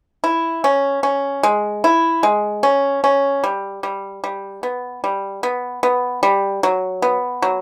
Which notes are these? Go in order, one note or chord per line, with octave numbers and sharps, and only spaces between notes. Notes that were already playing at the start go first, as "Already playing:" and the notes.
E4
C#4
C#4
G#3
E4
G#3
C#4
C#4
G3
G3
G3
B3
G3
B3
B3
G3
F#3
B3
F#3